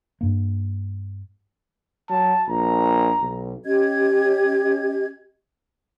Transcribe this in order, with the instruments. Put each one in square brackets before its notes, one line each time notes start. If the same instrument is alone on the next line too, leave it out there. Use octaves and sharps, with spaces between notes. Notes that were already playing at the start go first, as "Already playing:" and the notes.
[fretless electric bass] G2 A#3
[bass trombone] F#3 [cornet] A5
[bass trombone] A#1 [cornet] A#5
[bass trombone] B1
[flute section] C#4 G4 D#5 G#6